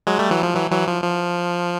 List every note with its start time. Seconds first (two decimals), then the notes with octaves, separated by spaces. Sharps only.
0.07 F#3 G#3
0.19 G3 A3
0.31 E3 F#3
0.43 F3
0.55 E3 F#3
0.71 E3 F#3
0.87 F3
1.04 F3